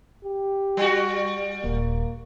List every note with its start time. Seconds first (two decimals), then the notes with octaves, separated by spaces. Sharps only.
0.25 G4
0.77 G3 F#4
1.64 D#1 A#3